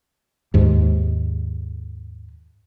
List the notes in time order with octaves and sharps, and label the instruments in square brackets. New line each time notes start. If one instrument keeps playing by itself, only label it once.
[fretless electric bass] D#2 G#2